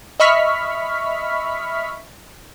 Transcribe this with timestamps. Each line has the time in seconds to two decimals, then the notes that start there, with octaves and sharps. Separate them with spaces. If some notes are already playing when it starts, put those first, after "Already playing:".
0.20 D#5 E5 B5 C#6 F6 B6